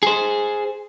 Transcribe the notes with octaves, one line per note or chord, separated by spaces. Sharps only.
G#4 C5